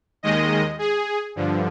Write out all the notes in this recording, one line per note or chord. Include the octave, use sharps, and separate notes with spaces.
D#2 D#3 G#3 D#5
G#4
G2 D3 F3